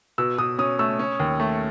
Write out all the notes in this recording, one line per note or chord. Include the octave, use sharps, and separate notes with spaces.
B2 E6
B2 D#6
C#4 D#6
A3 E6
C#4
D#2
A3